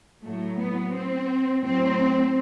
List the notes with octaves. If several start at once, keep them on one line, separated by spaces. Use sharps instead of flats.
A2 F#3 A3
B3
C4
A2 F#3 C4